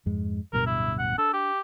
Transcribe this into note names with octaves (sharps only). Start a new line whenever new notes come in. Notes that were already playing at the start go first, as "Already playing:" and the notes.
F2 G#2 G#3
D1 G2 B2 A#4
E4
F#5
D4 A4
G4